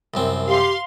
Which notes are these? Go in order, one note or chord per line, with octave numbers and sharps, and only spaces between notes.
C2 F#2 C4
G4 F5 C6